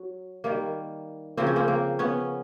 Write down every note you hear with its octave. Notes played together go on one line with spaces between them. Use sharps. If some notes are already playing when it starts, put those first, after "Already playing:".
Already playing: F#3
D#3 G3 A#3
C#3 F3 A#3 C4
C#4
A#3 C4
A#3
B3 C#4